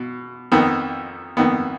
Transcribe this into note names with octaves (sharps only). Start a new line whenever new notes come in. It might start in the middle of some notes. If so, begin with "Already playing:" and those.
Already playing: B2
F2 D#3 B3
F2 D#3 B3